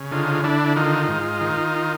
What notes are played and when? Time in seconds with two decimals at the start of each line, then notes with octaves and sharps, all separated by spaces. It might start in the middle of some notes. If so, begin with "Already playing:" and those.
Already playing: C#3
0.11 D3 D#4 F4
0.44 D3 D4 E4
0.76 D#3 D#4 F4
1.08 G#2
1.41 D#3